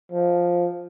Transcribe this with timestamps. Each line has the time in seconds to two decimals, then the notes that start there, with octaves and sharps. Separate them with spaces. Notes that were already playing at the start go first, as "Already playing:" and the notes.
0.12 F3